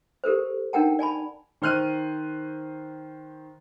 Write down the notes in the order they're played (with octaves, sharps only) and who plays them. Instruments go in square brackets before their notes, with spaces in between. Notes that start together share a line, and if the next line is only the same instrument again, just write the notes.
[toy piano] G4 A4 A#4 C5
D4 D#4 A#4 F#5 G5 A5
D5 G#5 A5 B5
[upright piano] D#3 C5 F6 F#6 D#7